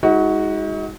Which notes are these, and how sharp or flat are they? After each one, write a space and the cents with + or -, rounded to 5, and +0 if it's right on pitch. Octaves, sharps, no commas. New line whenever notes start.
G#3 -15 D#4 +40 F#4 +0